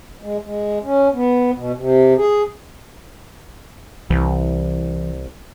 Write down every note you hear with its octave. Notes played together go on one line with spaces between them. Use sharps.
G#3
G#3
C#4
B3
B2
C3
G#4
C2 E3